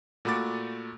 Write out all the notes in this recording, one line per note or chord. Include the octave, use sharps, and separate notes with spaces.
A#2 A3 F#4 B5 D6 A6